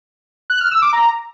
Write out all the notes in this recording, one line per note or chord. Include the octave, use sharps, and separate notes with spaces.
F#6
F6
E6
D6
A#5